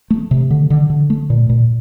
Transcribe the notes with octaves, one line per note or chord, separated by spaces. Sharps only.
A3
C3
D3
D3
D3
A3
A#2
A#2